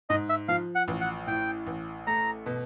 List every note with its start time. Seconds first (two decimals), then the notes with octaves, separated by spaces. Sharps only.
0.10 G#2 D#5
0.29 E5
0.48 F3 F5
0.75 F#5
0.88 A1
1.01 F#5
1.27 A2 G5
1.67 A1
2.07 A3 A#5
2.46 B2